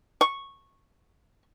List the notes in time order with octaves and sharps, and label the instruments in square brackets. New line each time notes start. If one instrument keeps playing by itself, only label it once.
[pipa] C#6